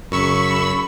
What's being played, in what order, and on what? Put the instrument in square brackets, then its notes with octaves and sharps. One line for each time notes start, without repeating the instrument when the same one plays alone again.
[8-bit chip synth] F#2 E6 [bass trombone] C#3 [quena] B5 [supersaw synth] C#6